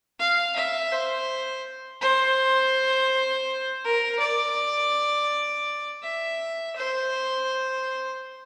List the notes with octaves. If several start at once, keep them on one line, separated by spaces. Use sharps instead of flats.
F5
E5
C5
C5
A#4
D5
E5
C5